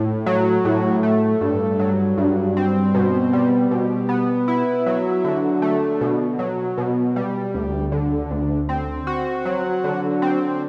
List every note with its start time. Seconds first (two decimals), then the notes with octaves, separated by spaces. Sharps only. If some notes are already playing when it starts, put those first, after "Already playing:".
Already playing: A2
0.26 F#3
0.65 A2
1.03 A3
1.41 G2
1.79 F#3
2.18 G2
2.57 C4
2.95 B2
3.33 G3
3.71 B2
4.09 B3
4.48 E4
4.86 F#3
5.24 D3
5.62 A3
6.01 B2
6.39 F#3
6.78 B2
7.16 G3
7.54 D2
7.92 D3
8.31 D2
8.69 C4
9.07 F#4
9.45 F#3
9.84 D3
10.22 C4